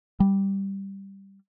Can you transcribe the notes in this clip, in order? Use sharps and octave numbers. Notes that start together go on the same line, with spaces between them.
G3